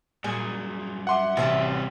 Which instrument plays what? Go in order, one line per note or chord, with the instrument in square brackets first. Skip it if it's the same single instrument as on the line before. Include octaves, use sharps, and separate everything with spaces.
[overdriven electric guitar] G2 F#3 [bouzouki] A#2 G#4
[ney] E5 [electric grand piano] F#5 C6 D6
[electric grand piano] A1 [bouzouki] C3 C4 A5 [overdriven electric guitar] G3 F#4